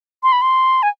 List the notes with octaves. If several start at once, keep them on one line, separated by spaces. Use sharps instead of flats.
C6
B5
C6
G#5